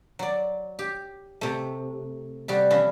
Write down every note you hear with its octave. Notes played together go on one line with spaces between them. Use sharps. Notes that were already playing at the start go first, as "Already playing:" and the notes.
F#3 D5
G4
C3 A3
C3 G3 F#4
E3 F3 C#4 E4